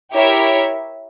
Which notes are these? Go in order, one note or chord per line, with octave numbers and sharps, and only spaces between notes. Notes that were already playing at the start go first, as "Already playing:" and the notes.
E4 G4 A#4 C#5 E5